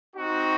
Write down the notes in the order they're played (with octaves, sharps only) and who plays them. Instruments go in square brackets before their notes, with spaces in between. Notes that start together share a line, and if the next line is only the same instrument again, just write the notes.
[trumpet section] C4 D#4 F#4